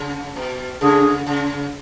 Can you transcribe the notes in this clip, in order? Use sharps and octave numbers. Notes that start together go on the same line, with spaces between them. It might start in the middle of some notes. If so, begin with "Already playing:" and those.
Already playing: C#3
B2
C#3 A3 D4 G#4
C#3